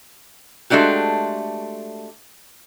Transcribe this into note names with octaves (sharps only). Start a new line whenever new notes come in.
G#3 A3 D4 F#4 G4